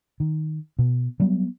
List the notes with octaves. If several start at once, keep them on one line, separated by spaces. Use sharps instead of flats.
D#3
B2
F#3 G3 B3